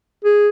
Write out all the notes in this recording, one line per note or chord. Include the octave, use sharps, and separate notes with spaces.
G#4